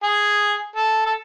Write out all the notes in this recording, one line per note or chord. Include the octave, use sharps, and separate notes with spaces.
G#4
A4
A4